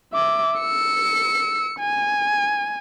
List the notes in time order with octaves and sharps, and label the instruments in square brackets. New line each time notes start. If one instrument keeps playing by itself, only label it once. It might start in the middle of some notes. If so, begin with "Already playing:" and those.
[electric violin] E5 D6
E6 C#7
G#5